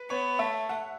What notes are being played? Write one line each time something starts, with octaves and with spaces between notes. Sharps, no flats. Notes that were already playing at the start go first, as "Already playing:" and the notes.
Already playing: B4
B3 C#5
A3 E5
F#5